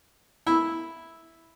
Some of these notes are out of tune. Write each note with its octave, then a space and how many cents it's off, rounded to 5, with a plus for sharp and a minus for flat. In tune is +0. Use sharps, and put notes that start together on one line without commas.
E4 -5